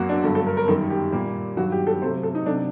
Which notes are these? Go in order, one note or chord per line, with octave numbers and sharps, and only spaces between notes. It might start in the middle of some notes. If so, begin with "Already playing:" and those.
Already playing: F#2 F#3 A#3 F#4
D4
G2 D3 F#3 A3 A4
A4
A#4
A#4
F#2 D#3 G3 A4
G4
A#2 G3 A#3
G2 D#3 F#3 F#4
G4
A4
C3 F#3 A3 C5
A4
D#4
C3 F#3 A3 D4